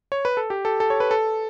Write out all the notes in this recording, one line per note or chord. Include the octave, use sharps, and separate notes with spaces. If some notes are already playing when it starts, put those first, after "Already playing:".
C#5
B4
A4
G4
A4
A4
C#5
B4
A4